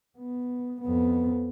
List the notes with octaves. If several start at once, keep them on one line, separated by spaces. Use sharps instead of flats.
B3
F2 B3